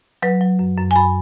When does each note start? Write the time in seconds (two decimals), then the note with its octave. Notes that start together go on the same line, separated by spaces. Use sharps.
0.22 F#3 B4
0.41 F#3
0.59 F#2
0.77 F#2
0.91 G#5
0.96 F#2 B5